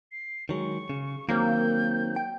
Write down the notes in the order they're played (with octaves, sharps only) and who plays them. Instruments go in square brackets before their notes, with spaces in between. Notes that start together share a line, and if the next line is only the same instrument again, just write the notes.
[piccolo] C7
[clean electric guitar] D#3 F#3 G#3 [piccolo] C#6
[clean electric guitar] C#3
[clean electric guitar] D#3 F#3 C4 [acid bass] A#3 [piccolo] G6
[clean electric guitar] G5